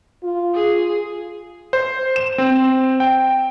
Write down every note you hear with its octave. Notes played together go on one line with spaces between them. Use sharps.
F4
G#4
C5
E7
C4
G5